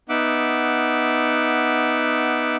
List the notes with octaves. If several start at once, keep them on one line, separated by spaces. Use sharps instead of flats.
B3 D#4 E5 F#5 D6